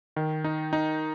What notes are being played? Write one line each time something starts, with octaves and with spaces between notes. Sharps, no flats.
D#3
D#4
D#4